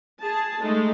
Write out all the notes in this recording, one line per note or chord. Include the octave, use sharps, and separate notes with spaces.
G#4 A5
G#3 A3 D#4